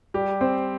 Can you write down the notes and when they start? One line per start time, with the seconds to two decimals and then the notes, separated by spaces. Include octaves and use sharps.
0.14 G3 G4
0.41 C4 C5